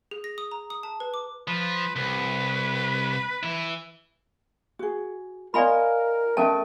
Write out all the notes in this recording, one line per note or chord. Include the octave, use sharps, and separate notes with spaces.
G#4
A#6
D#6
A#5
D#6
A5
B4
D6
F3 B4
C2 B4
E3 E4
F#4 G#4
F4 A#4 D5 D#5 F5 G#5 B5
A3 C#4 A#4 D#5 E5 G5 A5